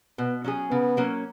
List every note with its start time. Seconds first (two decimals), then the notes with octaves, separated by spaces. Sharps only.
0.18 B2 B3
0.44 F#3 C#4 G#4
0.71 C#3 B3
0.97 F#3 A#3 C#4